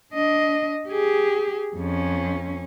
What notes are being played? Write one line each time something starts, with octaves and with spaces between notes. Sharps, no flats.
D4 D#5
G4 G#4
F2 C#4